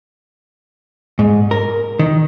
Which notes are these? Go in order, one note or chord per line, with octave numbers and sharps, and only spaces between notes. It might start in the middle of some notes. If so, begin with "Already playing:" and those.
G#2
A#4
D#3